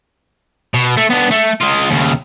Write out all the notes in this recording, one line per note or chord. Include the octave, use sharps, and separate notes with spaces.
B2
A3
B3 D4
A3
G#3 F4
D#2 C#3